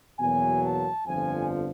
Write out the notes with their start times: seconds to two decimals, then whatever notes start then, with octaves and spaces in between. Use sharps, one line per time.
0.19 E2 B2 F#3 A#3 G#5
0.63 A5
1.07 G1 F2 D3 F3 G#5